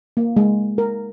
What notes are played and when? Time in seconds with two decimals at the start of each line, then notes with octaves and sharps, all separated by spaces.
0.17 A#3
0.37 G#3
0.78 A#4